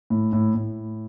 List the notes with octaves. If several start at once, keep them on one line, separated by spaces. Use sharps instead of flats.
A2
A2
A2